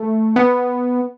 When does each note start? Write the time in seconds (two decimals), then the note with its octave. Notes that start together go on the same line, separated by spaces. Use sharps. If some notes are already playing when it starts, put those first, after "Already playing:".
Already playing: A3
0.36 B3